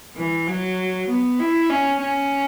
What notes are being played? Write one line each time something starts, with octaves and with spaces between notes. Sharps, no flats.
E3
F#3
B3
E4
C#4
C#4